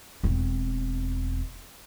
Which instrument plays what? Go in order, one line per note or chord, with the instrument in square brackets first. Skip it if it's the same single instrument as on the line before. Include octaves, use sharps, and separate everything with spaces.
[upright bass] E1 C4